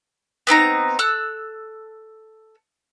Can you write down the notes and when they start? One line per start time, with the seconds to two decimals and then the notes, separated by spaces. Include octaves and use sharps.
0.47 B3 C4 D#4 A#5
0.99 A4 E6 F#6